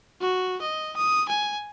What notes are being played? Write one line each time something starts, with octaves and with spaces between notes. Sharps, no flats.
F#4
D#5
D#6
G#5